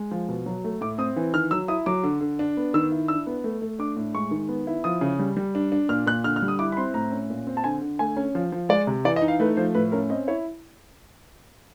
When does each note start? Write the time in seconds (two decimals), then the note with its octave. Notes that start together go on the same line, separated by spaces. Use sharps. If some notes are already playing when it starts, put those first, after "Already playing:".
Already playing: G#3
0.11 F3
0.29 B2
0.46 F#3
0.64 A3
0.81 A2 D6
0.98 C4 D#6
1.16 E3
1.34 D#3 F6
1.51 F#3 E6
1.68 E4 D#6
1.86 F#3 D6
2.03 D3
2.21 D3
2.39 D4
2.57 B3
2.74 D#3 E6
2.92 E4
3.08 D4 E6
3.27 B3
3.44 A3
3.62 A3
3.79 D4 D6
3.96 A2
4.14 G#3 C#6
4.31 D#3
4.49 B3
4.67 E4
4.84 F3 D#6
5.01 C#3
5.19 G3
5.37 G3
5.55 D4
5.72 D4
5.89 A#2 F6
6.07 A#2 F#6
6.24 D3 F6
6.36 F6
6.42 G3
6.48 D#6
6.59 E4 D6
6.72 B5
6.77 C4 C6
6.94 A2 A#5
7.12 C#4
7.30 A#2
7.47 C4
7.57 A5
7.64 D3 G#5
7.81 D3
7.99 A3 G#5
8.17 C#4
8.35 F3
8.52 F3
8.69 G#3 D5
8.87 C3
9.05 E3 D5
9.16 D#5
9.22 D#4
9.28 F5
9.40 A3 B4
9.57 F3 C5
9.75 A2 B4
9.92 C#4 A#4
10.10 C4 D#5
10.28 E4 C#5